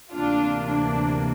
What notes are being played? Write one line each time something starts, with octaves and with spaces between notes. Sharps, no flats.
D2 C3 E3 A#3 D4 F4
D4